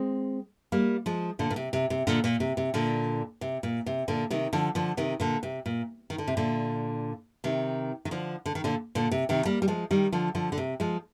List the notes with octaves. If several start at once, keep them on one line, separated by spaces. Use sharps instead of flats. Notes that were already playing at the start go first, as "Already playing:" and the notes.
Already playing: G#3 C4
G3 A#3
F3 G#3
A#2 D3
A#2
C3
C3
C3
A#2 D3
A#2
C3
C3
A#2 D3
C3
A#2
C3
A#2 D3
C3 D#3
D3 F3
D3 F3
C3 D#3
A#2 D3
C3
A#2
D#3
D3
C3
A#2 D3
C3 D#3
D#3
D3 F3
D3
D#3
A#2 D3
A#2 D3
C3
C3 D#3
G3 A#3
G3
F3 G#3
D#3 G3
D3 F3
D3 F3
D3
C3
F3 G#3